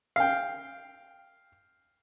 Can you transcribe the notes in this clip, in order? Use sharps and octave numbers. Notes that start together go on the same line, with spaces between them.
F5 G5